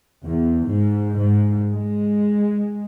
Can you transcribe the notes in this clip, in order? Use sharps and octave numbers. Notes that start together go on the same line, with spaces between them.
E2
G#2
G#2
G#3